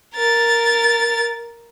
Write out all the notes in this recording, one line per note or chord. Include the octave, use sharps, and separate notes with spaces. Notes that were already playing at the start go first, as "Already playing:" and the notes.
A#4 A6